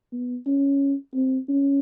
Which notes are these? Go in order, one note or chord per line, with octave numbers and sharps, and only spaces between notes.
B3
C#4
C4
C#4